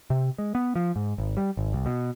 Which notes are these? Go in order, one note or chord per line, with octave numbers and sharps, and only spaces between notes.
C3
G#3
B3
F3
G#2
G#1
G3
G#1
C2
B2